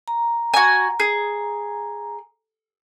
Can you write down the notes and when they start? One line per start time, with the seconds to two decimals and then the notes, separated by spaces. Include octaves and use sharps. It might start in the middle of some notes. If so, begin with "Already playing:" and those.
0.08 A#5
0.54 F#4 G#5
1.00 G#4